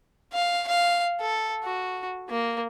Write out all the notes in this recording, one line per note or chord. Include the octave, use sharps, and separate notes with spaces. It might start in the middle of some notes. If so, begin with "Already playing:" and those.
F5
F5
A4
F#4
A#3